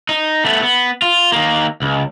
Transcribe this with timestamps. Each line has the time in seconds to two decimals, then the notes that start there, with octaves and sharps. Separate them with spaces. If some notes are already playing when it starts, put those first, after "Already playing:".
0.09 D#4
0.45 A3 B3
0.63 B3
1.02 F4
1.32 D#3 A#3
1.82 C#2